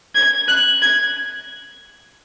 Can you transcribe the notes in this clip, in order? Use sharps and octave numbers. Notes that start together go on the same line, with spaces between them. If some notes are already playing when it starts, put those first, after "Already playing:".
G#6
F#6
G#6